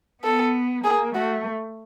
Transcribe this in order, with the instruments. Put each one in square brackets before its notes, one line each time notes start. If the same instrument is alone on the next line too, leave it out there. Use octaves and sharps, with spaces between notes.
[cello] B3 [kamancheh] A4
[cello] A#3 [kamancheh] G#4
[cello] A3 [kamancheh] F#4